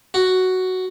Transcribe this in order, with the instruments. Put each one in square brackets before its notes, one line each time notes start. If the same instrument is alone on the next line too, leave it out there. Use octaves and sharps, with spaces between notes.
[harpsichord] F#4